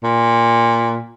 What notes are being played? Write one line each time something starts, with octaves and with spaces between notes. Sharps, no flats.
A#2